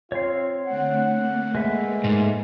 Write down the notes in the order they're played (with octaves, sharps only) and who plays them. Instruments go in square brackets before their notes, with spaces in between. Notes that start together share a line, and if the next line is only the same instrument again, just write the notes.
[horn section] C4 F4 [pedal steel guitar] C#5 C6
[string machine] D3 A3 C4 [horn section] F#5
[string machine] A3 A#3
[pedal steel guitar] G#3 B4 E5
[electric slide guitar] G#2